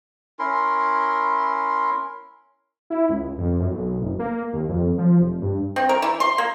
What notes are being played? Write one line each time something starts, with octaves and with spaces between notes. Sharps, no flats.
C#4 E4 A#4 C6
E4
C#2
F2
F#2
B1
F#1
A#3
D#2
F2
F3
F1
G2
C4
A#4
E3
C6
A#3